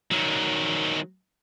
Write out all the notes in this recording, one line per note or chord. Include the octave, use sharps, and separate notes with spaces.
D#3 F#3